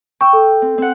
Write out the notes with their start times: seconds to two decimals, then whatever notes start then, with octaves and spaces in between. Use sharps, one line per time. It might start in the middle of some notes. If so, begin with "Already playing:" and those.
0.21 G5 C#6 E6
0.33 A4
0.62 C4
0.78 C4 F#5